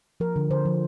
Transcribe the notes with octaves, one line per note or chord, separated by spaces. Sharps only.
F3 A#4
D3
D3 C5
F3